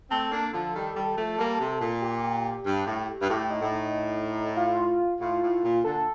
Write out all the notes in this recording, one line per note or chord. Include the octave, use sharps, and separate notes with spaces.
A3 C4 A4
A#3 D4
D3 F3
D#3 G3
D#3 G3
F3 A3
G3 A#3
C3
A#2
G4
G2
A2
G2
A2 G4
D#4
A2
D#4
F4
A2 F4
A2
A#2
A#2 D3 A4